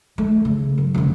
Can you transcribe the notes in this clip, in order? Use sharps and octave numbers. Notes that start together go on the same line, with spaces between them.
A3
C#3
F#2
F1 D3